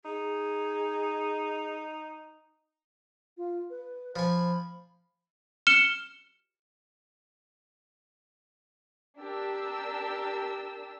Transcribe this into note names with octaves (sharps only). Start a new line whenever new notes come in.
D#4 G#4
F4
B4
F3 G#5 B5
F6 C#7 E7 G7
D4 G4 A#4 A5 E6